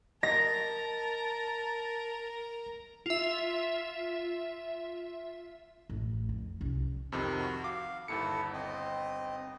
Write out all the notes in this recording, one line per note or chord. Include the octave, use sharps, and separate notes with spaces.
A#4 D#5 A5 A#5 A#6
F4 E5
A1
F2
C2 C#4
F2 C3 D#3
F#4
F5 D6
G1 D#2 E4 A4 C#7
C4 D#5